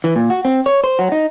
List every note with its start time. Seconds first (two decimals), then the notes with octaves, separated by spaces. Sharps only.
0.04 E3
0.16 A#2
0.30 F#4
0.45 C4
0.66 C#5
0.84 C5
0.99 F#3
1.12 D#4